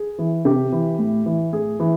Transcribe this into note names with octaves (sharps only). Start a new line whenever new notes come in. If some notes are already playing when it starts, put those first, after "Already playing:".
Already playing: G#4
E3
C3 G4
E3
A2
E3
A2 G#4
E3